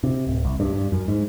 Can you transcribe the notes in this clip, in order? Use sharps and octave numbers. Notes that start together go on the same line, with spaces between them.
C3
D1
C2
G2
G2
F#2
G#2